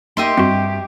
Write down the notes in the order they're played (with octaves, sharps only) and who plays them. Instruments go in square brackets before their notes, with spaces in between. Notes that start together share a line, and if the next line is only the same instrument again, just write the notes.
[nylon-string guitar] A#3 D#4 [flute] G4 [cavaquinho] D#5 E5 C6
[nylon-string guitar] G2 [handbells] C4 F#4